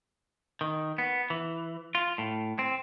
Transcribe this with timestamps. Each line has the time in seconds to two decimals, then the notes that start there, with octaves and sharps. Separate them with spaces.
0.61 D#3
0.98 B3
1.30 E3
1.95 F4
2.18 A2
2.59 C4